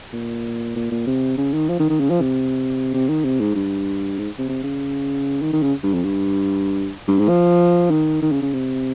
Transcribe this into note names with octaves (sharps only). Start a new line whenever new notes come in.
A#2
A#2
A#2
C3
C#3
D#3
F3
D#3
D#3
C#3
F3
C3
C3
D#3
C3
G#2
G2
G#2
C3
C3
C#3
D#3
D#3
C#3
G2
F2
G2
G2
G#2
F3
D#3
D#3
C#3
C#3
C3